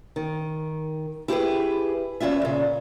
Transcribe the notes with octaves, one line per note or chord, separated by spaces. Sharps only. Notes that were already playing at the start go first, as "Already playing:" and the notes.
D#3
E4 G4 G#4 B4
E2 C#4 F4 E5
A#2 C#3